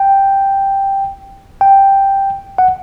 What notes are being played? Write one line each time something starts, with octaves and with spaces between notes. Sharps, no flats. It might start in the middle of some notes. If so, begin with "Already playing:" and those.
Already playing: G5
G5
F#5